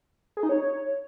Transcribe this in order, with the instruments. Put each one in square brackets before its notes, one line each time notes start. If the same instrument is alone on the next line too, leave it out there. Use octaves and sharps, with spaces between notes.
[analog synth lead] G#4
D#4
C#5